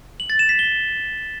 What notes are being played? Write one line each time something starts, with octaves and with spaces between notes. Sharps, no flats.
F#7
A6
E7
B6
G7